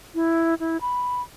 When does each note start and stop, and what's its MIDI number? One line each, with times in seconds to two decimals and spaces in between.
0.15 0.55 64
0.60 0.77 64
0.81 1.22 83